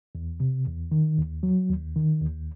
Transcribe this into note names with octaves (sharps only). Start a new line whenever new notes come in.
E2
C3
E2
D#3
D#2
F#3
D#2
D#3
D#2